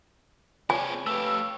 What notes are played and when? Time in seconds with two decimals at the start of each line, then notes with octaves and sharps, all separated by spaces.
0.70 C4 G#4 C#5 D5 G#5
1.07 A3 G4 B4 C#5 F5 E6